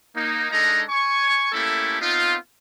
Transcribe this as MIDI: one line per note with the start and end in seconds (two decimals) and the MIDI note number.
0.15 0.51 58
0.15 0.51 63
0.51 0.82 56
0.51 0.82 62
0.51 0.82 63
0.51 0.82 69
0.51 0.82 75
0.51 0.82 82
0.89 1.49 80
0.89 1.49 85
1.52 2.00 57
1.52 2.00 58
1.52 2.00 61
1.52 2.00 64
1.52 2.00 67
1.52 2.00 69
2.00 2.35 59
2.00 2.35 60
2.00 2.35 63
2.00 2.35 65